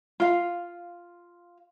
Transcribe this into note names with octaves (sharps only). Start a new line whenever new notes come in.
F4 F5